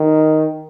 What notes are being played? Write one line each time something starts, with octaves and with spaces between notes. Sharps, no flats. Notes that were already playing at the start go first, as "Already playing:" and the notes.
Already playing: D#3